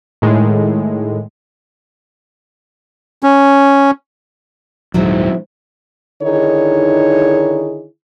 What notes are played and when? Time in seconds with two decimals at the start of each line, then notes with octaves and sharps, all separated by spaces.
0.22 A2 D#3 G#3
3.23 C#4
4.94 D#1 G#2 F#3 C4 E4
6.23 D3 D#3 D#4 E4 G#4 C#5